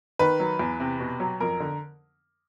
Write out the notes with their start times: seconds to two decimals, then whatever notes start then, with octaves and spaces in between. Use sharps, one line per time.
0.19 D#3 B4
0.40 F#3
0.59 E2
0.80 C3
1.00 B2
1.20 F#3
1.40 F2 A#4
1.60 D3